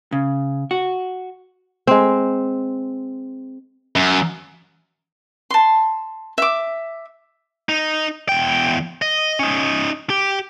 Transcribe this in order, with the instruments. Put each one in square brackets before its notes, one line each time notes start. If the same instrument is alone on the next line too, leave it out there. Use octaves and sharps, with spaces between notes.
[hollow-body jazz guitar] C#3
F#4
[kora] G#3 C4
[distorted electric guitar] F#2
[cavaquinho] A5 C6
E5 D6
[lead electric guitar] D#4
E2 G5
D#5
C#4 D#4
G4